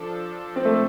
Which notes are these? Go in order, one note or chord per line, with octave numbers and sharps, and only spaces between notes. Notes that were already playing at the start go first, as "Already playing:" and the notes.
Already playing: F3 D4 A4
C4
A3